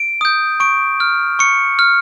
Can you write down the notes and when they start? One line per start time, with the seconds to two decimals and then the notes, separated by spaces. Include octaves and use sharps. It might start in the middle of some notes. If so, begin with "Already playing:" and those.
Already playing: D7
0.21 D#6 G6
0.60 C#6 D7
1.00 F6
1.39 C#6 C#7
1.79 F6